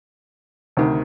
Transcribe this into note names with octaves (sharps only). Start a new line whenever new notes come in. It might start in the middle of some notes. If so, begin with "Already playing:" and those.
D2 C3 D#3